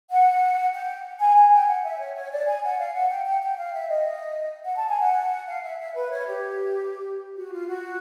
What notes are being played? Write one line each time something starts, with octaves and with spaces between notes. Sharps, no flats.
F#5
G5
G#5
G#5
G5
F#5
E5
C#5
C#5
D5
G#5
F#5
F5
F#5
G5
G5
G5
F5
E5
D#5
F#5
A5
G#5
F#5
F5
E5
E5
B4
C#5
G4
F#4
F4
F#4